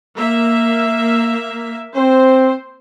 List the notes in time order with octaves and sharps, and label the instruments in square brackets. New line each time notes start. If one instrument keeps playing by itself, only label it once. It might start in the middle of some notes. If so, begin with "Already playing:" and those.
[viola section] A#3 E5
[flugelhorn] C4 [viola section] C5